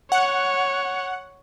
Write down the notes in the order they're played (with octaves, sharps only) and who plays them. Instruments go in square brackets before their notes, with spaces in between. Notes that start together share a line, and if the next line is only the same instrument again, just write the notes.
[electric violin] C#5 [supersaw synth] F#5